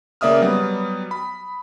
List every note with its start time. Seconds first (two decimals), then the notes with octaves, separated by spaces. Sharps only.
0.21 C#3 A#3 D5 E5 D#6 F6
0.41 F#3 G3 B3
1.11 B5